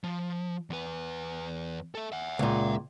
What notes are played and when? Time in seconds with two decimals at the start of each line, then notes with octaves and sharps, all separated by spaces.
0.04 F3
0.70 E2 B4
1.95 A4 E5
2.12 E5 F#5
2.39 C#2 A#2